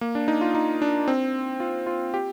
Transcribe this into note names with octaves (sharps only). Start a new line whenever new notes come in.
A#3
D4
D#4
F4
D#4
D4
C4
F4
F4
G4